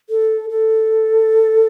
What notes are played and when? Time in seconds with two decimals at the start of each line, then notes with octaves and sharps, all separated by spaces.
0.10 A4
0.50 A4